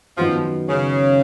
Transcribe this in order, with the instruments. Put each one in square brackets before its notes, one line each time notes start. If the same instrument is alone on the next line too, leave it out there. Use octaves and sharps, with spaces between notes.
[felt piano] F#2 D#3 F#3 B3 F#4 [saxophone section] F3
[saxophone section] C#3